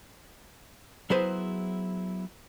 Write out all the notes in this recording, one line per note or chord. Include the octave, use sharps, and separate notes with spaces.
F#3 B3 E4 G#4 B4 C5